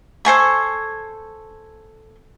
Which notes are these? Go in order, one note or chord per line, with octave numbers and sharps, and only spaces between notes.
A4 C5 G#5 C#6